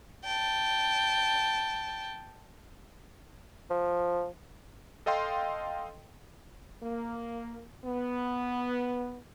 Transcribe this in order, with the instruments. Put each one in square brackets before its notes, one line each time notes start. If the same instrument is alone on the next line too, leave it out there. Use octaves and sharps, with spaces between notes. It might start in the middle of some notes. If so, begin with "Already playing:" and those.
[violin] G5 A5
[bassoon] F3
[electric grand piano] A4 D#5 F5 G5 C6
[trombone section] A#3
B3